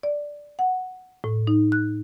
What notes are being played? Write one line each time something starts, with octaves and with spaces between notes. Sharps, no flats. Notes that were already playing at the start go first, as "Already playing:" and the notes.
D5
F#5
A2
D#4
F#6